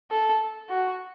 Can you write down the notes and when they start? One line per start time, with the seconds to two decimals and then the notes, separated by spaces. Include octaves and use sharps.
0.11 A4
0.69 F#4